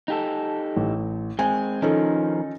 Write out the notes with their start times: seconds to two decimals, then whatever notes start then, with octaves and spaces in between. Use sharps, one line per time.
0.08 D#4 G4 A4
0.76 A1
1.39 G#3 C4 G#5
1.82 D#3 F3 C#4 D#4 A4